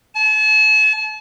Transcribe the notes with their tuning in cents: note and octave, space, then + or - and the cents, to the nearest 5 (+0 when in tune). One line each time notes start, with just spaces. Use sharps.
A5 -40